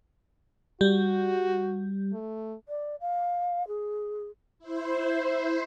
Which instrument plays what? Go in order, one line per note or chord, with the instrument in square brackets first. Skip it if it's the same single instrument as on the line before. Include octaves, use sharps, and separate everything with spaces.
[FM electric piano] G3 [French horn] F#4
[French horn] A3
[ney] D5
F5
G#4
[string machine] E4 C5